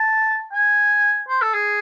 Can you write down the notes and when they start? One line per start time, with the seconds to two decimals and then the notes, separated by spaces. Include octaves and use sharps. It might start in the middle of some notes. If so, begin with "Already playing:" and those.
Already playing: A5
0.53 G#5
1.29 C5
1.42 A4
1.54 G#4